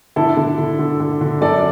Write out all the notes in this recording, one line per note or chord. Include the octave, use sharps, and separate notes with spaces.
D3 E4 A4
D3
D3
D3
D3
D3
F#2 A4 D5